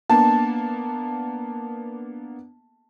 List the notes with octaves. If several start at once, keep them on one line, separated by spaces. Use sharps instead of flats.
A#3 B3 D4 A5